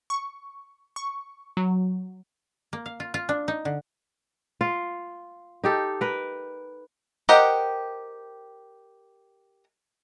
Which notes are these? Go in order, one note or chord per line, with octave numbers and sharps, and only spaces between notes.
C#6
C#6
F#3
A#3
F5
F4
F4
D4
D#4
D3
F4
D#4 G4 A4
A#4 B4
G4 A#4 C5 D#5 F#5